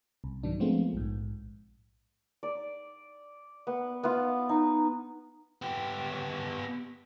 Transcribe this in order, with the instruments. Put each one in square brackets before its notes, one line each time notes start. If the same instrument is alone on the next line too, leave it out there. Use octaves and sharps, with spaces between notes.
[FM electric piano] C2
G#2 D#3 F#3 D4
F3 G#3 A3 B3 C4 F4
A#1 G#2
[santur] D5
B3
B3 F4
D#4
[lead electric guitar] B3 G4